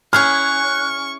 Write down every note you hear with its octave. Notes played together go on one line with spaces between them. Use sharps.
C#4 E4 G#4 C#6 F6 F#6